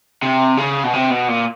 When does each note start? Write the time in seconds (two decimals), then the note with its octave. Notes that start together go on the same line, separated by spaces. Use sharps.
0.23 C3
0.57 C#3
0.84 B2
0.93 C3
1.10 B2
1.28 A#2